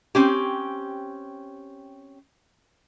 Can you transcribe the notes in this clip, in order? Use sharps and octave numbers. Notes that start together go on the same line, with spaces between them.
C4 C#4 G4